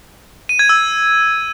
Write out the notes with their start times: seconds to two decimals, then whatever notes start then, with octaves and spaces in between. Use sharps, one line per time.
0.49 D#7
0.59 G#6
0.69 E6